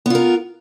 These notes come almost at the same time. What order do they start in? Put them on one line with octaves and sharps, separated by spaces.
B3 F4 A#4